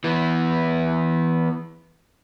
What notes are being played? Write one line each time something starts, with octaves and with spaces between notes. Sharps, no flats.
E3 B3